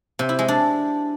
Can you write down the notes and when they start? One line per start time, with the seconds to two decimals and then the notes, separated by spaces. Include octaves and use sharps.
0.19 C3
0.29 E4
0.39 G#3
0.48 D4